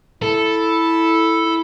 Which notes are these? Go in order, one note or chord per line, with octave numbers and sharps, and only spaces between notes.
E4 A4
E4